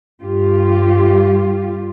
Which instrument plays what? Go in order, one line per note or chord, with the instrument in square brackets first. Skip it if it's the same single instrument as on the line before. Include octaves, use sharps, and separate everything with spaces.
[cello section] G2 F4 G4